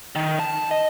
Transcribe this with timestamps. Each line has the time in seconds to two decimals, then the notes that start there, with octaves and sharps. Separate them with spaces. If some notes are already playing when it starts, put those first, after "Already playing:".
0.15 D#3
0.40 A5
0.71 D#5